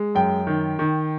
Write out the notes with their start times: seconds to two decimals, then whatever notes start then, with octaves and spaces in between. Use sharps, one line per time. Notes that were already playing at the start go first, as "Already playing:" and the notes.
Already playing: G#3
0.15 F#2 G5
0.47 D#3
0.79 D#3